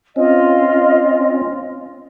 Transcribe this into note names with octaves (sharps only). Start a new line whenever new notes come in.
C4 C#4 F4 D#5